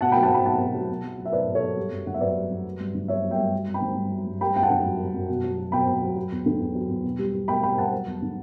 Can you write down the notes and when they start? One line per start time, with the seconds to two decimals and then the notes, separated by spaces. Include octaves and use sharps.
0.01 B2 F#5 A5
0.12 F#3 G5 B5
0.23 F#5 A5
0.30 F#3 G5 B5
0.45 B2 F#5 A5
0.59 B2
0.74 F#3
0.90 B2
1.04 F#3
1.18 F#3
1.26 E5
1.33 B2 B4 D5
1.48 B2
1.55 A4 C#5
1.62 F#3
1.77 G3
1.92 F#2
2.06 D3 F#5
2.14 E5
2.21 F#2 B4 D5
2.36 G3
2.50 F#2
2.65 F#3
2.80 G2
2.94 D3
3.08 G2 C#5 E5
3.24 F#3
3.31 E5 G5
3.38 G2
3.52 F#3
3.68 G2
3.74 G5 B5
3.82 D3
3.97 G2
4.12 F#3
4.27 G2
4.41 G3 G5 B5
4.55 F#2 G5
4.63 F#5 A5
4.70 D3
4.85 F#2
5.00 G3
5.14 F#2
5.29 B2
5.44 F#3
5.58 F#3
5.72 B2 G5 B5
5.87 B2
6.02 F#3
6.16 F#3
6.32 E2
6.46 D3
6.60 E2
6.75 F#3
6.89 E2
7.04 B2
7.19 G3
7.34 G3
7.48 B2 G5 B5
7.63 B2 G5 B5
7.78 G3 F#5 A5
7.93 F#3
8.06 E2
8.22 D3